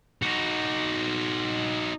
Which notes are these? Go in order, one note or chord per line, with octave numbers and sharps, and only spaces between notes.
D#4 F#4